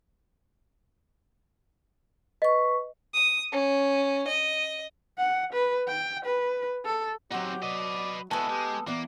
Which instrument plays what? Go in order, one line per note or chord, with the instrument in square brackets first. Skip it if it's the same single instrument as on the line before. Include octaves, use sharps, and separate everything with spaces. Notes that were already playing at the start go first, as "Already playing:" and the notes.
[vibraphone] B4 C#6 [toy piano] D#5
[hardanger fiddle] D#6
C#4
D#5
[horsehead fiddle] F#5
B4
G5
B4
A4
[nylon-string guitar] F#3 F#5 [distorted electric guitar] C4 D#4 [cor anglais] G4
[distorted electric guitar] B4 D#5 [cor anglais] D5
[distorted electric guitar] G#3 F#4 [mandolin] B3 A4 [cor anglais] E4 [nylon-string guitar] G#5
[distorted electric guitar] G#3 [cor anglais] G4
[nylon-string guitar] E3 B3 [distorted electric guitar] A#3 [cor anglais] D5